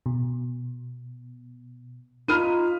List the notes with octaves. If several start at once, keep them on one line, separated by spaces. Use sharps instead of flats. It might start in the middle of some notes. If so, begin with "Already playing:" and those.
B2
D#4 F4 A#4 B5 F6 D#7